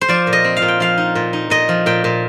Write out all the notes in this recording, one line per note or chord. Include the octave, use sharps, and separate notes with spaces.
C5
F3 D5
A#2
D#5
C4
F5
A#2
G5
F3 F5
D#4
A#2
D#4
A#2 D#5
F3
A#2 G5
A#2